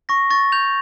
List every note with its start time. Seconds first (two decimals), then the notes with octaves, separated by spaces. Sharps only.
0.09 C#6 A#6
0.30 C#6 A6
0.52 G6 F7